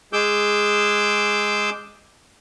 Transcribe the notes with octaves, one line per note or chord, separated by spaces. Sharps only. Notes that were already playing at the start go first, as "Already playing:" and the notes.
G#3 G#4 D6 E6 G6